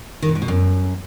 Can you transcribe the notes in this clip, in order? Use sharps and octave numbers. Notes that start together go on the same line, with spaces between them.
D#3
B2
G#2
B2
F#2